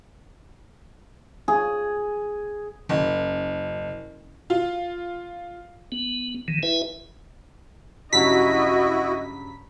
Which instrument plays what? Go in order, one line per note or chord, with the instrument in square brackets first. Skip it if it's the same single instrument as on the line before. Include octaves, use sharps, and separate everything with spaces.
[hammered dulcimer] G#4
[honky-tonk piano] F#1
F4
[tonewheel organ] B3
D#3 E3
E4 B4 E5 G#5
[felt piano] G2 C#3 F#3 [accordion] E4 F#4 [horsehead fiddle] D#5 [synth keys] B6